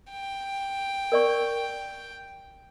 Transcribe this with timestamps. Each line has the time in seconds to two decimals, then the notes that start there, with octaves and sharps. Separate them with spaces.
0.11 G5
1.12 A#4 D5 C#6